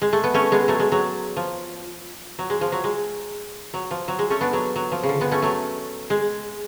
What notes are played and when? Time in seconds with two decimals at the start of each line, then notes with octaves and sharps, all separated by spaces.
0.02 G#3
0.13 A3
0.24 B3
0.34 A3 C#4
0.52 G#3 B3
0.68 F#3 A3
0.80 G#3
0.92 F#3
1.36 F3
2.39 F#3
2.50 G#3
2.61 F3
2.72 F#3
2.84 G#3
3.74 F#3
3.91 F3
4.08 F#3
4.19 G#3
4.30 A3 C#4
4.41 B3 D4
4.53 F#3
4.76 F#3
4.92 F3
5.03 C#3
5.09 D3
5.20 G#3 B3
5.31 A3 C#4
5.42 F#3 A3
6.10 G#3